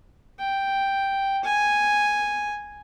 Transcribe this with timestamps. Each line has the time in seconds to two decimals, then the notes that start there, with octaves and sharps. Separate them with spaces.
0.39 G5
1.44 G#5